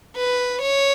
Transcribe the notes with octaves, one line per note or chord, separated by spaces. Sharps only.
B4
C#5